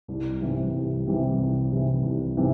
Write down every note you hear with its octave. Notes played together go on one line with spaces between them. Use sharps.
C2
C3 E3 G3
C2
C3 E3 G3
C2
C3 E3 G3
C2
C3 E3 G3